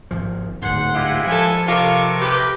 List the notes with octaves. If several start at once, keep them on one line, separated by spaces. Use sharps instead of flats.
G#1 F3
D1 G#2 F#5 C6
G#3 E4 F4 G4
F3 A4 G#5
C3 F4 A4 A#4 C#6 D6
G4 B4